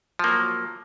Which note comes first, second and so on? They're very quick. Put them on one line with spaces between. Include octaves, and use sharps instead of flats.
F3 A#3 F#3